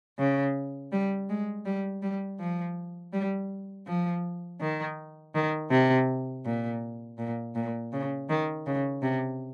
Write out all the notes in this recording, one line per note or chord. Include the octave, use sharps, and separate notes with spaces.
C#3
G3
G#3
G3
G3
F3
G3
F3
D#3
D#3
C3
A#2
A#2
A#2
C#3
D#3
C#3
C3